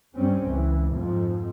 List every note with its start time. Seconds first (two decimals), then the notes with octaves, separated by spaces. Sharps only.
0.16 G2 G3 C4 C#4
0.46 C#2 E3
0.93 F2 G#2 F3